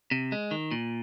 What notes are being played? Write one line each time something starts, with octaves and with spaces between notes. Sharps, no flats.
C3
G#3
D#3
A#2